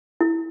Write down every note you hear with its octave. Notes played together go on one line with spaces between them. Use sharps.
E4